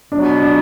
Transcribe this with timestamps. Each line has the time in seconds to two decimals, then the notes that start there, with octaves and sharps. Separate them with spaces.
0.11 B2 F#3 B3 D4
0.42 D4